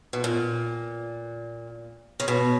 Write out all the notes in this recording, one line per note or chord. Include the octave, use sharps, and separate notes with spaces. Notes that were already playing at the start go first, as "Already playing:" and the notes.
B2
A#2
C#3
B2